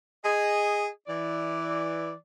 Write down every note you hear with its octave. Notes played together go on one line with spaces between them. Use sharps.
G#4 D#5
E3 D5